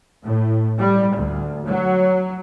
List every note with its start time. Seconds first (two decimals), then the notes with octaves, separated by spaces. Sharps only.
0.24 A2
0.79 G3
1.14 D2
1.66 F#3